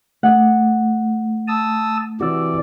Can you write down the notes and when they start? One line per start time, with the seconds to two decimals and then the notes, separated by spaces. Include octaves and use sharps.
0.23 A3 F#5
1.48 A5 D#6 E6
2.21 C3 E3 F#4 D5 E6